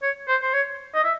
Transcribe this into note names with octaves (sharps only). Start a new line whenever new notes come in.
C#5
C5
C5
C#5
D#5
E5